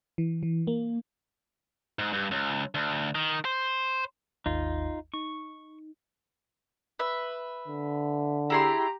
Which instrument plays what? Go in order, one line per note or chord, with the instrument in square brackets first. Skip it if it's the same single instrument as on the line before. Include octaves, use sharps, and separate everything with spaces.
[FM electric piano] E3
E3
A#3
[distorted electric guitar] G#2
G2
C#2
D2
D#3
C5
[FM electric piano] G#1 D#2 [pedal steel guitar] D#4 F4
[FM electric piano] D#4 [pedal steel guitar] C#6
[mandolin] B4 E5
[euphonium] D3
[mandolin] E4 G#4 C6 [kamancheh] G4 A#5